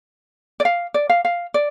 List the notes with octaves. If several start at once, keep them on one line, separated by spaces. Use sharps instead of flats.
D5
F5
D5
F5
F5
D5